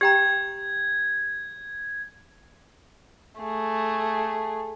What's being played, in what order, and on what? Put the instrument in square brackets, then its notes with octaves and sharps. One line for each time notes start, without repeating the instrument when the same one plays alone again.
[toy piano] G4 G5 A#5 [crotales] G#6
[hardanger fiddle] A3 G#4